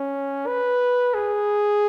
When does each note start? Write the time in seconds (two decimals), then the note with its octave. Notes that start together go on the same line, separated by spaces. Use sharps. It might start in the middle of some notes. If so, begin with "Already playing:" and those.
Already playing: C#4
0.47 B4
1.14 G#4